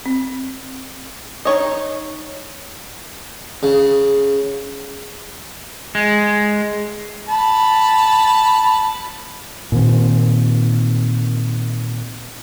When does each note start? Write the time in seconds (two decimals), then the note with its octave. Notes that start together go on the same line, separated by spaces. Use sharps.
0.06 C4
1.45 D#4 C#5 D#5
3.63 C#3
5.95 G#3
7.29 A5 B5
9.72 A#2 D#3 C4